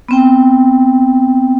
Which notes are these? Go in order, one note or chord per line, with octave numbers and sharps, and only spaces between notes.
B3 C4 G5